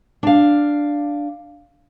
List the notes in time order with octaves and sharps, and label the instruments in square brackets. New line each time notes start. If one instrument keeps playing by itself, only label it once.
[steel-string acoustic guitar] D4 F5